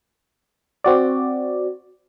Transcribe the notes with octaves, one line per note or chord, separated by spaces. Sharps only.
C4 F#4 D5